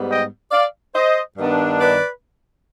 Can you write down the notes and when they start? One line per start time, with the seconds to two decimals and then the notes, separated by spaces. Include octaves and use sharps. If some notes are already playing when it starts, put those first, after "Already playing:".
Already playing: G#2 G3 B3
0.09 D#5 G5
0.52 D5 F5
0.94 C5 D#5
1.38 G2 D#3 B3 D4
1.80 B4 D5